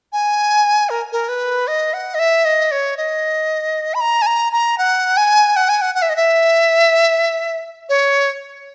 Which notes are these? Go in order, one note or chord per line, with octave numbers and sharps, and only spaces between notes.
G#5
A#4
A#4
B4
D#5
F#5
D#5
E5
D#5
C#5
D#5
B5
A#5
G#5
A#5
A#5
F#5
G#5
F#5
G#5
F#5
F#5
E5
D#5
E5
C#5